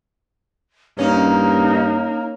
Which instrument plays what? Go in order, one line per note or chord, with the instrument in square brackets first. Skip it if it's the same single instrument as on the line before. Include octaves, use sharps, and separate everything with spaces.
[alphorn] G2 [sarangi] A#3 [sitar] C#4 [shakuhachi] D#4